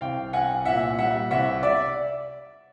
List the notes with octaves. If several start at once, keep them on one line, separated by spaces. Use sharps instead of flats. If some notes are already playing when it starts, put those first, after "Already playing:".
C2 F5 G5
C2 F#5 G#5
A#2 E5 F#5
G3 E5 F#5
C2 E5 F#5
D5 E5